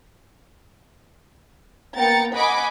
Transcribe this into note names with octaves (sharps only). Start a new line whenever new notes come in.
A#3 B3 G5 A#5 A6 C#7
D#5 F#5 G#5 B5 D6